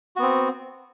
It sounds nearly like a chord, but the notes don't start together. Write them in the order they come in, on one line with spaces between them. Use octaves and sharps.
F#4 B3 C4